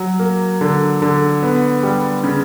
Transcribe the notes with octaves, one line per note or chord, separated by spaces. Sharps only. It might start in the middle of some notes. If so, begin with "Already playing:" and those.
Already playing: F#3
A#3
D3
D3
B3
G3
C#3